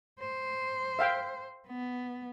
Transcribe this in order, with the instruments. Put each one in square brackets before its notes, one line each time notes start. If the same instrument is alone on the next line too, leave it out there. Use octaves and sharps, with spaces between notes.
[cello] C5
[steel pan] E5 F5 G5
[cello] B3